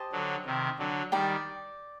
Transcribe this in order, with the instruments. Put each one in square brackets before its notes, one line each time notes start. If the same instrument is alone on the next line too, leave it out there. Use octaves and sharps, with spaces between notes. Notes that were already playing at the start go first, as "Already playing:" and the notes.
Already playing: [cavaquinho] G4 C5 D#5 A5
[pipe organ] D3 F#3
C3 D#3
D3 F#3
[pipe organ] D#3 G3 [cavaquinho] D5 G5 A#5